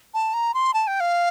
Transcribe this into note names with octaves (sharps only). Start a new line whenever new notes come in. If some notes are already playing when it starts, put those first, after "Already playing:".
A5
A#5
C6
A5
G5
F5